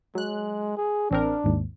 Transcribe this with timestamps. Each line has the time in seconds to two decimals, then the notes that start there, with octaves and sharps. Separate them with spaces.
0.15 F#3 G#3 F#6
0.77 G#4
1.11 A1 C4 D4 A#4
1.44 G#1 D#2 G#2